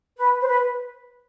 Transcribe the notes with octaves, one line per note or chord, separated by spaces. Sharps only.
B4
C5
B4